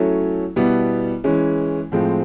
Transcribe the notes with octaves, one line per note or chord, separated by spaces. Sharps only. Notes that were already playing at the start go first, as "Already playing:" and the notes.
Already playing: F#3 A3 C#4 E4 A4
B2 G3 B3 E4
E3 G#3 C#4
A2 F3 G#3 C4